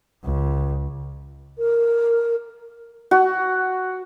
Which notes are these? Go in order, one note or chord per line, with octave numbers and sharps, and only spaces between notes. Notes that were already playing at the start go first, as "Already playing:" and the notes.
C#2
A#4
F#4